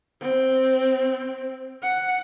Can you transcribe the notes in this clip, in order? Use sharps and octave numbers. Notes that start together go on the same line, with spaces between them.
C4
F#5